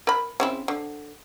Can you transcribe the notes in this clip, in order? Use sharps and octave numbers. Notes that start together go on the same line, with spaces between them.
A#4 B5
C#3 C4 E4
D3